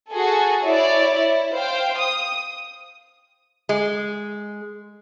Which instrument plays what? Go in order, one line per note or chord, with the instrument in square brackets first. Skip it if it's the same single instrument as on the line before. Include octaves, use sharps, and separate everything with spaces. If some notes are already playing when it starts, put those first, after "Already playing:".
[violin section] F#4 G#4 A4
E4 C#5 D5
E4
C5 F5 G5
D#6
[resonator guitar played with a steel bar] G#3